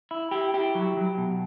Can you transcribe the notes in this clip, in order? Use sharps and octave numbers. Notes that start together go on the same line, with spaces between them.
E4
E4 G4
E4 G4
F#3
F#3
B2